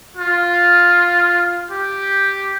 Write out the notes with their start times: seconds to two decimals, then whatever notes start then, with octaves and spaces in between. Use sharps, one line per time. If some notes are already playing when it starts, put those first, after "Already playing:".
0.17 F4
1.71 G4